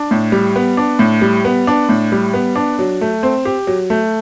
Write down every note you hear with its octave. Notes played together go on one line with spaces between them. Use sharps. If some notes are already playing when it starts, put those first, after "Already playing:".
Already playing: D4
A2
G3
B3
D4
A2
G3
B3
D4
A2
G3
B3
D4
F#3
A3
C4
G4
F#3
A3